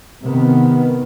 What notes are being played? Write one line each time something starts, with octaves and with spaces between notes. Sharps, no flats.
C3 D#3 B3